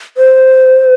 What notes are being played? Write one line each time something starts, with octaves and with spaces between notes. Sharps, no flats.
C5